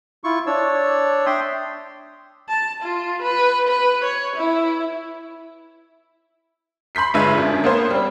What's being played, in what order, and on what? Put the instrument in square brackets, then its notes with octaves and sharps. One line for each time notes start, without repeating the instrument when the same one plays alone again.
[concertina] E4 F4 C#6
D4 C#5 D5 E6
E5 G5 C6 D#6
[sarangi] A5
F4
B4
B4
C#5
E4
[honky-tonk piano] B5 C6 G6 B6 C7
G1 G2 G#3 B4 E5 G#6
F#2 D3
A#3 B3 C5
G3 C4